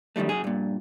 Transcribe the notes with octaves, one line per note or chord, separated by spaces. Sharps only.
F#2 D3 D#3 G3 A3
F#2 G#4
G2 A#2